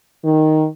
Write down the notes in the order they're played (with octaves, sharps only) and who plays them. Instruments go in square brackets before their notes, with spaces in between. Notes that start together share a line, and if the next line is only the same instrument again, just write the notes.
[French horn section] D#3